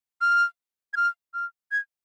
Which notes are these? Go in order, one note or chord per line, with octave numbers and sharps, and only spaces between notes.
F6
G#6
F6
F6
G#6